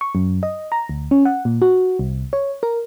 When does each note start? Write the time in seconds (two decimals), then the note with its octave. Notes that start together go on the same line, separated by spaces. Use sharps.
0.01 C#6
0.15 F#2
0.43 D#5
0.72 A#5
0.89 D2
1.11 C#4
1.25 F#5
1.45 A#2
1.62 F#4
1.99 C2
2.33 C#5
2.63 A#4